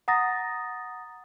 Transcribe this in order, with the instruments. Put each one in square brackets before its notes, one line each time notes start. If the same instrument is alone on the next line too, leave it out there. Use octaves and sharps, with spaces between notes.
[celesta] F#5 A#5 D#6 A6 A#6